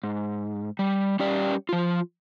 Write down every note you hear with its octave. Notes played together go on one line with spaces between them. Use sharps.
G#2
G3
G3 C#4 G4 D5
F3 F4